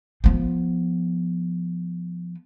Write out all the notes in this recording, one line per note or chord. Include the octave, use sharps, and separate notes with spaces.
F3 B3